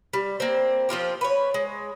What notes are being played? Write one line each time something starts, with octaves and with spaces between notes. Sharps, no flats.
G3
A#3 C4
F3 C4 F4 G4
B4 C#5
G#3